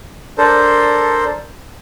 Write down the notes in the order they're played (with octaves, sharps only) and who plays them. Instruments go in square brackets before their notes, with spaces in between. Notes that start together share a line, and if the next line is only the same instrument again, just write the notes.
[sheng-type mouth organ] D4 A4 A#4 C5